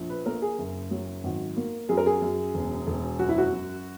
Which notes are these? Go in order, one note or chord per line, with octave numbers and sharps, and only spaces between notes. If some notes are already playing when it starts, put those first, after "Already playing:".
Already playing: A#1
B4
A#3 A#4
G#4
F#1
F#3
G#1
A#3
F#2 G#4
A#4
G#4
F#2
E1
E1
F#2 F#4
E4
F#4
F#2